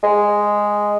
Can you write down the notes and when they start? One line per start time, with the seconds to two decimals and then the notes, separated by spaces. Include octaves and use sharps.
0.03 G#3